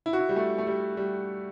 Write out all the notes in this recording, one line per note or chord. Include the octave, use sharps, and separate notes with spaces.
E4
F#4
E4
G3
A3
A3
G3
G3